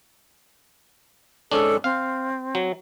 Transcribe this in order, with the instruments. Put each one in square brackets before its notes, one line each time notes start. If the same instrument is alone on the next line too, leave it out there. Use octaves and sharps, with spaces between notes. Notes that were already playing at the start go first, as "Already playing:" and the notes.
[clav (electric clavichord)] G#2 C#4 D4 [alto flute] A4
[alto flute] C4 [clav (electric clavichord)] F5
[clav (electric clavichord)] F#3